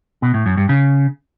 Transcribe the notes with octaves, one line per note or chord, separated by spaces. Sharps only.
B2
A2
F#2
G2
C#3